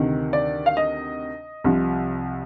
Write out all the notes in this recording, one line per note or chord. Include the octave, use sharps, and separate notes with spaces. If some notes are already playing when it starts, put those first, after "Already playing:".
Already playing: D2 C3 D#3
D5
F5
D#5
C2 C3 F3